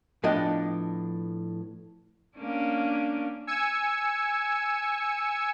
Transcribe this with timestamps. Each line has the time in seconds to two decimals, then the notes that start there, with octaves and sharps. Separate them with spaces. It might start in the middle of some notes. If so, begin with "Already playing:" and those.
0.24 A2 F3 B3 D4 D#5 G5
2.38 A#3 C#4 D4
3.47 G#5 E6 G#6 C#7